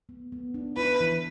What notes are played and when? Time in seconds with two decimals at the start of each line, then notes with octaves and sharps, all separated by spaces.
0.09 B3
0.32 B3
0.54 D4
0.77 E4 B4
1.01 E3